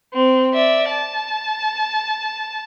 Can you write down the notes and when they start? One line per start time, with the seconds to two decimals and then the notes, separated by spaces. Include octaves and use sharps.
0.14 C4
0.54 D5 E5
0.89 A5